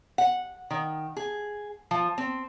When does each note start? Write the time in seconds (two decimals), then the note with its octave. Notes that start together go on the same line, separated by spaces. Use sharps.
0.18 F#5
0.70 D#3
1.17 G#4
1.91 F3
2.18 C4